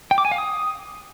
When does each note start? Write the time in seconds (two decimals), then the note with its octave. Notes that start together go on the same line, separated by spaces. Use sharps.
0.11 G5
0.18 D6
0.25 G#5
0.31 F5
0.38 D#6